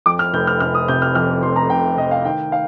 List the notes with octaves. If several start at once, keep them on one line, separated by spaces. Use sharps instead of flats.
F2 D6
F6
F1 G6
F6
F1 F6
D#6
C3 G6
F6
F2 F6
F1 C6
A#5
F1 G5
F1 D#5
F5
D#3 G5
F5